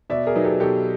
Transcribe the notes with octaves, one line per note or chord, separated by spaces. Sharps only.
B2 D5 E5
G#4 A#4
F#3 B3 D#4
G4 A4
B2 G4 A4